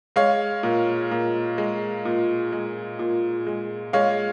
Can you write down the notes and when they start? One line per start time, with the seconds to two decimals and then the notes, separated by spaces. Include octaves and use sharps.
0.16 G#3 C#5 F5
0.63 A#2
1.11 A#2
1.58 G#3
2.05 A#2
2.52 G#3
2.99 A#2
3.47 G#3
3.93 G#3 C#5 F5